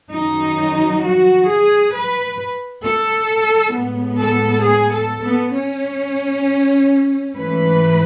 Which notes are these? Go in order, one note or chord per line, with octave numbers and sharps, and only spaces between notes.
F#2 D#3 F#3 D#4
F#4
G#4
B4
A4
A2 G#3 B3
A4
G#4
A4
B3
C#4
G#2 E3 A3 B4